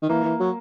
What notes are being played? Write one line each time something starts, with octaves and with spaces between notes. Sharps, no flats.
D#3
E3 A#3
E3
F#3